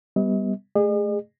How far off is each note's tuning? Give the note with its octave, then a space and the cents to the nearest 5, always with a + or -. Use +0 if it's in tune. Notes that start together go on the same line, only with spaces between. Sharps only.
G3 +0 B3 +0 D#5 +40
A3 -20 G#4 -25 D#5 -45